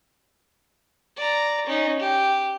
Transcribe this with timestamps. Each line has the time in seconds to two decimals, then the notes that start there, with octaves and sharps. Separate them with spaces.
1.17 D5 A#5
1.67 C#4 D#4
2.00 G4